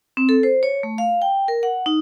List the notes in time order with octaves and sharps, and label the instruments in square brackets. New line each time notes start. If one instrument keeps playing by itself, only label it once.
[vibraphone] C4
A4
C5
C#5
A3
F5
G5
A#4
F#5
D#4